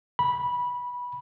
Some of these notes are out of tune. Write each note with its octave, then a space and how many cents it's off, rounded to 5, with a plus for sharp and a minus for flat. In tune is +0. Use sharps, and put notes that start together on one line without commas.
B5 -15